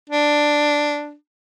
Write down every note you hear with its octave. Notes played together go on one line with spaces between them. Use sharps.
D4